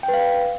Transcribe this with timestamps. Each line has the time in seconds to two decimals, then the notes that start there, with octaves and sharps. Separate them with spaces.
0.03 G5
0.08 B4
0.14 F5